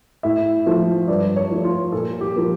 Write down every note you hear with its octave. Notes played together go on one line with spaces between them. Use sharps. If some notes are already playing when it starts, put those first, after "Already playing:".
A2 E5
F3 A3
G2 D5
C#5
F3 A3
F4
A#2 A4
G4
F3 A#3